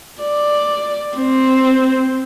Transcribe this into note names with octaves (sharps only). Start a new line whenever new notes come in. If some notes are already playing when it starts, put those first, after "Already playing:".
D5
C4